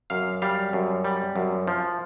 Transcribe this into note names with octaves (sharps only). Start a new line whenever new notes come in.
F#2 F5
G3 F5
F#2
G3
F#2
F3